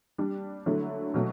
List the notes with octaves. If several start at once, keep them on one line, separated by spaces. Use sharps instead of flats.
G3 D4 G4
D3 F#3 A3 E4
B2 F#3 A3